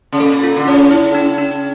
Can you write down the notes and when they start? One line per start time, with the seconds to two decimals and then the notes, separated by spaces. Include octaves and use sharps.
0.12 C#3
0.20 A#2 A4
0.44 F4
0.56 D3
0.67 C#3 C#5
0.91 E4
1.15 D4
1.38 D4